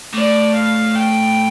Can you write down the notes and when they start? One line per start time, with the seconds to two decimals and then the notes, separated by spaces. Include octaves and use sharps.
0.14 A2 D5
0.55 F5
0.96 G5